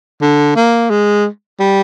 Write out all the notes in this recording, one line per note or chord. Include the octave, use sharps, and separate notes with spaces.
D3
A#3
G#3
G3